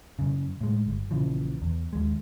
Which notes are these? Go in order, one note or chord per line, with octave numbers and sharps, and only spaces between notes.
F#2 C#3
A2 G#3
G1
A#1 C#3 E3 F3
E2
D#2 G#3